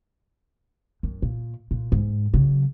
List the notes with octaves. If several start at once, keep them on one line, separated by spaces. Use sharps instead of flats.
F#2
A#2
A#2
G#2
C#3 F#3